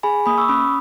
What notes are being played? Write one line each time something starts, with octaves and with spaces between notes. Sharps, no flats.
G#4 G#5 B5
A#3 B5 D#6
C#6 E6
C#4 B5 D#6